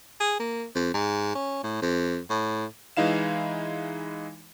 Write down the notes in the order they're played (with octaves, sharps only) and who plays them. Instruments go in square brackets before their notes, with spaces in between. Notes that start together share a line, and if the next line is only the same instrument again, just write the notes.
[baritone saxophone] G#4
A#3
F2
G#2
C#4
A2
F2
A2
[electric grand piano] E3 G#3 D#4 E4 F5 E7